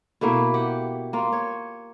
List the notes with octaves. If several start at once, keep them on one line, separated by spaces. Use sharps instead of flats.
B2 A3 A#3 E4
G4 F#5
A#3 F4
C#5